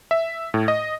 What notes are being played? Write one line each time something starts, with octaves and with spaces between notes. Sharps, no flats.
E5
A2
D#5